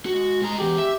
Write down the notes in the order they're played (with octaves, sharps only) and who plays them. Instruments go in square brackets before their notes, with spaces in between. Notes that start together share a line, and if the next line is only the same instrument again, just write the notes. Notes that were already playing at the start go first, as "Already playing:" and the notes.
[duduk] G#3 [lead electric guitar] F#4
[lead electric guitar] G#2 A#5
[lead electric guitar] E3 G#4 [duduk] G4
[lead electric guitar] E5